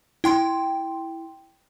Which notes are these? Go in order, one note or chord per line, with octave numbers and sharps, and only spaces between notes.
E4 G5 C6